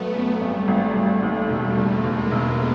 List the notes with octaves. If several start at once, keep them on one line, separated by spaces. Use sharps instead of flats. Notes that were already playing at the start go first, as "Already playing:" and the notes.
Already playing: G#1 F#3 A3 B3
F#2
G#1 G3 A3
G#1
G#1
D#2 G3 A3
E1
D#2
D#2 G#3 A#3
E1
A3 B3